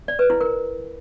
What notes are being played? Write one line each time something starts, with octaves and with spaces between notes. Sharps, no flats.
D5
B4
E4
A#4